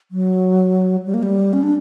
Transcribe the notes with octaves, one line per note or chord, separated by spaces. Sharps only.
F#3
G3
A#3
G3
C#4
D4